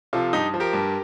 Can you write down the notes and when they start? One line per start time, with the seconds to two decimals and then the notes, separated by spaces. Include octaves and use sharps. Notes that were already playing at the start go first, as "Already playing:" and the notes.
0.13 C3 F3 F4 A4
0.33 G2 D#4 G4
0.54 F3
0.60 G4 A#4
0.73 G2